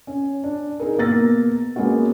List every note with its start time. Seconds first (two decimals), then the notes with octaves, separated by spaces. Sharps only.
0.07 C#4
0.44 D4
0.80 D#4 G#4 A#4
0.98 B2 A#3 E6 A6 A#6
1.76 G#3 A#3 B3 C#4 F#4